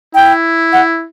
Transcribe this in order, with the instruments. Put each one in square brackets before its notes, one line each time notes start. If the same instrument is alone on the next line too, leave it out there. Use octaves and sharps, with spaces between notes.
[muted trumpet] E4 [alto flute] G5
[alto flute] F#5